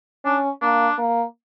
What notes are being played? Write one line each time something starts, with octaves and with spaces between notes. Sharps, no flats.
C#4 D4
A#3 D4
A#3